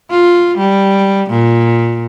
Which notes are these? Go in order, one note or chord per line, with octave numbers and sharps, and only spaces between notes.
F4
G3
A#2